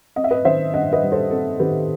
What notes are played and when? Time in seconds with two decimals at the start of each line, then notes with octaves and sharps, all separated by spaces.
0.16 C4 D#5
0.24 E5
0.31 B4 D#5
0.45 D#3 C5 E5
0.74 G2 D#5 F#5
0.92 B4 D#5
1.02 G3
1.12 A4 C5
1.31 C4 A4
1.60 D#3 G4 B4